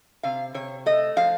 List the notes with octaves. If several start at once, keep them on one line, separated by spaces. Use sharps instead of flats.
C3 F5
C3 C#5
A3 D#5
F3 F5